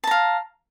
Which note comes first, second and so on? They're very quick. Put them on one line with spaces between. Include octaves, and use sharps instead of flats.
A5 A#5 F5